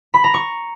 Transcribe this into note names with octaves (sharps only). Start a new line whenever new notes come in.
B5
A#5
C#6